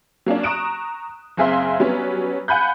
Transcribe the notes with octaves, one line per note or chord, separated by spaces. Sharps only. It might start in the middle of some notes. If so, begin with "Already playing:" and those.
F#3 A#3 C#4 D4
A#5 C#6 D#6 F#6 D7 E7
F#1 C4 G#4 E5 F5 C6
F#3 G3 B3 C#4
F5 F#5 G#5 B5 F#6 G6